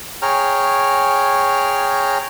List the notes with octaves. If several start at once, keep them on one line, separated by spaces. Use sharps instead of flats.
G#4 C#5 G5 A#5 F6